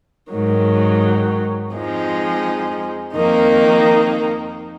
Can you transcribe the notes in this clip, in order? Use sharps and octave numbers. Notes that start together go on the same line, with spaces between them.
G#2 D#3 F#3
F2 F3 G#3 D#4
F2 D#3 A#3 D#4